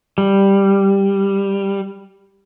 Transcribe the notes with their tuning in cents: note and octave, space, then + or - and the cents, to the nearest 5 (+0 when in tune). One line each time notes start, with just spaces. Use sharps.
G3 +5